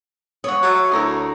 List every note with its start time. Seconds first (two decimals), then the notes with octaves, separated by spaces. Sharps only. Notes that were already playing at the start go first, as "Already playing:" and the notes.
0.44 C#5 F#5 D#6
0.63 F#3 A3 F#5
0.91 D2 E4 A#4 D#5